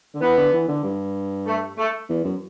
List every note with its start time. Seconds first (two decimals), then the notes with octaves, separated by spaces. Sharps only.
0.15 D3
0.22 E3 B3
0.37 D3
0.53 E3
0.68 D3
0.84 G2
1.47 A3
1.78 A3
2.09 E2
2.24 F#2